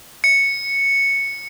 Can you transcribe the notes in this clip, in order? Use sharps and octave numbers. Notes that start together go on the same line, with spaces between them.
C#7